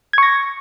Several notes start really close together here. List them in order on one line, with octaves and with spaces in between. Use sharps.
G#6 C#6 A#6